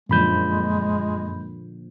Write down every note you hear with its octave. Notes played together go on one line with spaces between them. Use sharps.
F#2 A#2 D3 F3 G#3 B5 G6